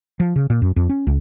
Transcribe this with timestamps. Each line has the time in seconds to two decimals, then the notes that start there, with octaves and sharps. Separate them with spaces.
0.20 F3
0.36 C#3
0.50 A#2
0.62 F#2
0.76 F2
0.89 C#4
1.07 C#2